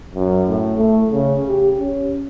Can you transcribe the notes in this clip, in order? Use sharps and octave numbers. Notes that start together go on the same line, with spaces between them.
F#2
A2
A3
C#3
G4
C#4